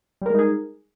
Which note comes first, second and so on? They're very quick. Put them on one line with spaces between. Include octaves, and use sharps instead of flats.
G3 A#4 G#3 D#4 G#4